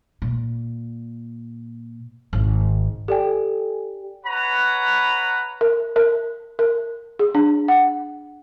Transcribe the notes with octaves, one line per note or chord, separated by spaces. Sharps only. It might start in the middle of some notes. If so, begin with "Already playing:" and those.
A#2
G#1
G4 A4 D5 G5 G#5
B4 C#5 F#5 A#5 B5
A#4
A#4
A#4
G#4
D4
F#5